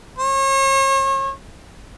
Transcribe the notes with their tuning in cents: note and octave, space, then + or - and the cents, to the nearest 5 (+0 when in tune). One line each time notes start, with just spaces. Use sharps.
C#5 -40